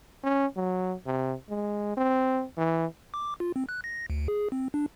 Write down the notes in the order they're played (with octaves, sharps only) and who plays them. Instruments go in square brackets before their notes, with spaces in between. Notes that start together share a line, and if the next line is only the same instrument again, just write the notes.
[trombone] C#4
F#3
C3
G#3
C4
E3
[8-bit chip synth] D6
F4
C4
F#6
A#6
D2
G#4
C4
D4